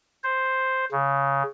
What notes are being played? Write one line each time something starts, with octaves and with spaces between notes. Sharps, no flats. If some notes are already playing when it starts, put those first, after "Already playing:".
C5
C#3